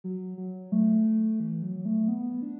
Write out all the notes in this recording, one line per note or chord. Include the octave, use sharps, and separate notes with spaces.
F#3
F#3
A3
E3
F#3
A3
B3
D4